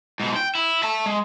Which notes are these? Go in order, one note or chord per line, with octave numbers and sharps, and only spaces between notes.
G#2 B2
G5
E4
E5 A5
G#3